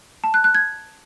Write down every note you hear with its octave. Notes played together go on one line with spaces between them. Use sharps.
A5
F#6
F#6
G#6